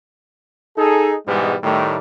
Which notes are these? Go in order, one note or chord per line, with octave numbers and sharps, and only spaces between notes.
D#4 G#4 A4
G#2 B2 E3 G3 G#3 B3
A2 D#3 G3 A3